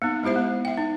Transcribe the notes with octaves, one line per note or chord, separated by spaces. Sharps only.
A#3 B3 D#4
G#3 E4 G4 C5 E5
B3
E5 G5
D#4